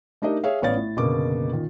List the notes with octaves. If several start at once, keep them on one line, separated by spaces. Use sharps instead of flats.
A3 D4 D#4 G4 A#4 D#5
G#4 C#5 E5 F5
A1 B3 C#5 D5 F5 A6
A2
F#1 B2 D3 A#3 D6
A#2 D#3